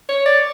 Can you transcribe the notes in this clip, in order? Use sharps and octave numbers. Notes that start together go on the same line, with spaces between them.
C#5
D5